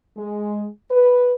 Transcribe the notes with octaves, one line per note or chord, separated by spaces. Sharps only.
G#3
B4